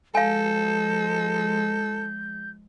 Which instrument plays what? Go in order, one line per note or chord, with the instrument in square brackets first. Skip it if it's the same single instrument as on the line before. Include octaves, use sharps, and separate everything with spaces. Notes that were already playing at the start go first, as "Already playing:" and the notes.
[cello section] F3 G#3 [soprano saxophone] A4 [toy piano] F5 G#5 [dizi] G6